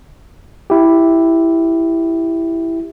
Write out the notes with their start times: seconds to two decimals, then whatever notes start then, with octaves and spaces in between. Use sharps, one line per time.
0.70 E4 G4